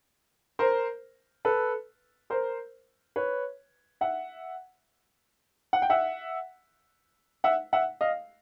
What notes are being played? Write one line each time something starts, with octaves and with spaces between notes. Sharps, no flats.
A#4 C5
A4 B4
A#4 C5
B4 C#5
E5 F#5
F#5
G5
E5 F#5
E5 F#5
E5 F#5
D#5 F5